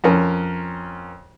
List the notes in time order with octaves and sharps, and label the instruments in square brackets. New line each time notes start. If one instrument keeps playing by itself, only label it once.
[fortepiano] F2 C#4 A#4